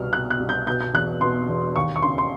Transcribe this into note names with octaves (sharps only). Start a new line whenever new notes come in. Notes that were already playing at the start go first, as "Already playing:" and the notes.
Already playing: C2 B2 F6
B2 F#6
F#6
C2
G6
B2 G6
G6
E2 F#6
B2 C6
E2
D#2 C#6
C#6
C#3 C6
C6